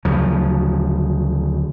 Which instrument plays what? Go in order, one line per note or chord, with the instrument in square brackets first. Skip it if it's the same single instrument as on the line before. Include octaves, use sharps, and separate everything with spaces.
[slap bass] D2 C#3 F3 F#3